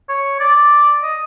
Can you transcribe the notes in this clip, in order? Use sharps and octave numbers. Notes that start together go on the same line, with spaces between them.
C#5
D5
D#5